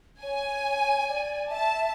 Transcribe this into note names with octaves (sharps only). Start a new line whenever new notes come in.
C#5 G#5
D5
E5 A5